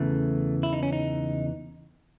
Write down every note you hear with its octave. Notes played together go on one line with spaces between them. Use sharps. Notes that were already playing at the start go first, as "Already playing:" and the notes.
Already playing: E2 C#3 E3 A3
E4
D#4
C#4
D#4